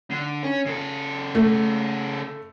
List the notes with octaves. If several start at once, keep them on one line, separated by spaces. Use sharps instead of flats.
D3
C#4
C#3 A4
A3